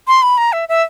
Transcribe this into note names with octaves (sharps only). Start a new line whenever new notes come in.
C6
B5
A#5
E5
E5